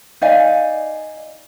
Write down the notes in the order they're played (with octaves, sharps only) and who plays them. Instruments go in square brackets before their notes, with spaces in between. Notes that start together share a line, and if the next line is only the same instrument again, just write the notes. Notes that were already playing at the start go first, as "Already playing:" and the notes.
[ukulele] D#4 D5 F5 G#5